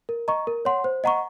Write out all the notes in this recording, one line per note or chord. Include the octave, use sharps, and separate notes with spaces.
A#4
D#5 A#5 C#6
A#4
C#5 F#5 C6
C5
D#5 F#5 A#5 C#6